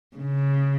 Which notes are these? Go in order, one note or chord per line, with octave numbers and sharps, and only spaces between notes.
C#3